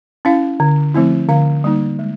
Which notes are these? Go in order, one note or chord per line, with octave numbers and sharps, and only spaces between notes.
C#4 E4 F5
D3
F3 A3 C4 E4
D3 F5
G3 A#3 D#4
G#3